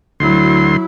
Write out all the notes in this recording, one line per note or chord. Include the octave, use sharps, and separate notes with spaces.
D2 F#3 E4 C6